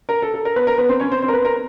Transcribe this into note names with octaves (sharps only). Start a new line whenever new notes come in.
A#4
A4
A4
A#4
B3 B4
A#4
B3 B4
C4 C5
C#4 C#5
C4 C5
C4 C5
A#4
B3 B4
A#4